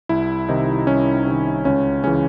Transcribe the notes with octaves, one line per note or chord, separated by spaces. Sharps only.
C2 E4
C3 D#3 D#4
C2 C#4
C3 D#3
C#2 C#4
C#3 E3 C#4